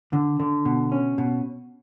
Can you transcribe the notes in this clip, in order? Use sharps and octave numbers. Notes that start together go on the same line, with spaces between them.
D3
D3
B2
C#4
B2